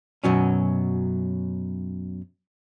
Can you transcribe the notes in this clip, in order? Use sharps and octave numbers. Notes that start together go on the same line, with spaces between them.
F#2 B2 F#3 C#4